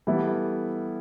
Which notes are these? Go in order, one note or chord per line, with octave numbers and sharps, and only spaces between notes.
E3 G3 B3 E4 A4